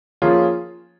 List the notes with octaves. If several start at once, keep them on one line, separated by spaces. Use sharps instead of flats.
F3 A#3 C#4 F4 G#4